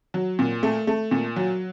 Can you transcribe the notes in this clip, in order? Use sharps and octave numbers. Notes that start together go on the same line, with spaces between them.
F#3
A#2
A3
A3
A#2
F#3